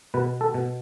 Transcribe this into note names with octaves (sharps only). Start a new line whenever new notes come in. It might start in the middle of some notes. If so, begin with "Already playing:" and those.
B2 B4
A4
B2